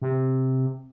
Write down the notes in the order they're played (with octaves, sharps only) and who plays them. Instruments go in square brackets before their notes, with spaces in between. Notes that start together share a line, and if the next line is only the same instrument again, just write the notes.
[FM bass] C3